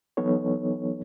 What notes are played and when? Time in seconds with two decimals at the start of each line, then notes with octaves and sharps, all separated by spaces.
0.17 E3 F#3 B3 D#4 A4 C#5